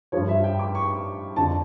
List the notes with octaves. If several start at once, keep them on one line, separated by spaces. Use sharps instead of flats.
G2 F3 C#5
E5
G5
D6
C#6
F2 D3 F3 A5